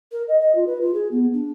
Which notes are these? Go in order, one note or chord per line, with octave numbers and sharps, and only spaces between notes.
A#4
D#5
D#5
F4
B4
F4
G#4
B3
D4